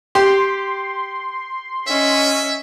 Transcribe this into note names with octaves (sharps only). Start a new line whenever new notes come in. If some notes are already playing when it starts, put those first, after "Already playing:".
G4 C6
C#4 D#5 E5